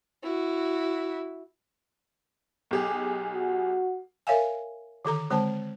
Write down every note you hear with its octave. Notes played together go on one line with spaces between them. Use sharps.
E4 F#4
B1 G4 G#4
F#4
A#4 C#5 E5 F5 G#5
D3 D#3 A4 A#5
D3 G#3 C4 C5 A5